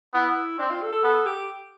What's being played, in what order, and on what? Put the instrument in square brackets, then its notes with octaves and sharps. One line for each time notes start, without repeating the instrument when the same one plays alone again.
[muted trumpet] B3 [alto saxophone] E4
[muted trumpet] C4 [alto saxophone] D4
[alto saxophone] F4
A4
A4
[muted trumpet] B3 [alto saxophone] A4
[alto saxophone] G4